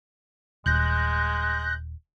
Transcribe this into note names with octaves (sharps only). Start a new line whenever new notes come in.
D#1 G#3 F#6 G6 A#6